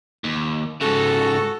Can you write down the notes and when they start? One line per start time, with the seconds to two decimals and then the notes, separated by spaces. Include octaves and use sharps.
0.24 D#2
0.81 G#2 C#3 F#4 A4